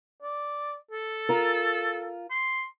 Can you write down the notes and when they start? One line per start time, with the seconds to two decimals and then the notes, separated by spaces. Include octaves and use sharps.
0.22 D5
0.91 A4
1.29 F4 A#4
2.31 C6